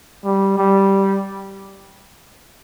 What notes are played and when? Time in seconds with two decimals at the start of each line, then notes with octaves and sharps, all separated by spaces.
0.24 G3
0.58 G3